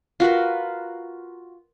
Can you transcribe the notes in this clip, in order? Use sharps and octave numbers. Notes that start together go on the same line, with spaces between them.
F4 F#4 A#4 B4